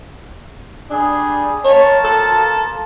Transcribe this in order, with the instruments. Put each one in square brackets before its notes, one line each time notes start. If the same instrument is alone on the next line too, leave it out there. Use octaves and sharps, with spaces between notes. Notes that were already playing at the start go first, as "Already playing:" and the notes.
[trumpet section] G3 G#4 [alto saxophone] D4
[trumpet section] A#3 F4 A5 [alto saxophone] C#5
[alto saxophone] A4